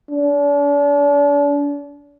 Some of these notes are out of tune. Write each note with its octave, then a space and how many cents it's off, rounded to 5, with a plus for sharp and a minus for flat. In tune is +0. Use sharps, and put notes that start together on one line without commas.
D4 -40